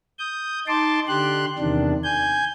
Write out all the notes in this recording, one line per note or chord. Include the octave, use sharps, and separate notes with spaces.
D#6 G6
D#4 A5 C6 D6
D3 G4 C6 F#6
E2 C3 D#3 D4
G#5 G6